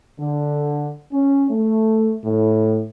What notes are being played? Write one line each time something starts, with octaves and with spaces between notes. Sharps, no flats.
D3
C#4
A3
A2